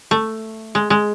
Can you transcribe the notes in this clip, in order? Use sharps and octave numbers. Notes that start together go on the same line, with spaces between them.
A3
G#3
G#3